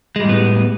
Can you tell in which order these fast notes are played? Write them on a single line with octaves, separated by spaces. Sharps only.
G#3 G3 A2 B3